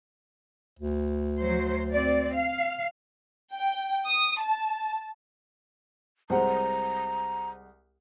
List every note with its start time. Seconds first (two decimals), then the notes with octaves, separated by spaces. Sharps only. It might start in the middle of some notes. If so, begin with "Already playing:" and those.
0.79 D2
1.41 F#3 C5
1.92 C4 D5
2.33 F5
3.53 G5
4.06 D#6
4.40 A5
6.30 C2 G#3 C5 F#5 A#5